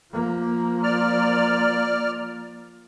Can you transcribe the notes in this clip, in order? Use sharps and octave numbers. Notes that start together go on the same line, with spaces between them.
F3 A#3
D5 F6